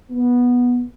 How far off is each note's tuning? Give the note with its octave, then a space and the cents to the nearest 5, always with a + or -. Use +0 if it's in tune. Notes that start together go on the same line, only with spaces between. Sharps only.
B3 -10